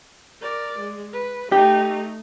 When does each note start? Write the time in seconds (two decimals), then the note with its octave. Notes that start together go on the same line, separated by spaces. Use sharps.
0.42 A#4 D5
0.79 G#3
1.13 B4
1.52 A3 D#4 G4